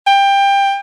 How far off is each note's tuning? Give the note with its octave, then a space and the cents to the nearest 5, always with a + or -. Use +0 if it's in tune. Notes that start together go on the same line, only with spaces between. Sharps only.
G5 +20